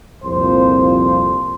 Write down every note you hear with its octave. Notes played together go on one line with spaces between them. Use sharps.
C2 F2 A#2 F3 C5